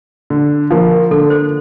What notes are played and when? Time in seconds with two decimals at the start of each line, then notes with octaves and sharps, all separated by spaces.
0.30 D3
0.71 F3 A#3
1.11 D3 A4
1.30 C5